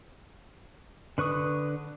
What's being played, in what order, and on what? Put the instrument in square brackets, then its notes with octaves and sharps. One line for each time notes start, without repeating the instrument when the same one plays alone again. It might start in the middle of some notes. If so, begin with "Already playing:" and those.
[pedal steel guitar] D3 B4 C#6 D#6